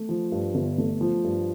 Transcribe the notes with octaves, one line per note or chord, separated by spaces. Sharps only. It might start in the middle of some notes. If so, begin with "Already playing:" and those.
Already playing: A3
F3
G2
G1
A3
F3
G2